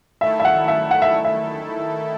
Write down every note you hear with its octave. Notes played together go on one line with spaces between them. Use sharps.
D#3 A3 E4 A4 E5
E5
F#5
E5
F#5
E5
E5